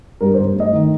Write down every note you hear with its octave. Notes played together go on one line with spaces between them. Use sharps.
G2 A#4
C5
G1
A3 D#5
D#3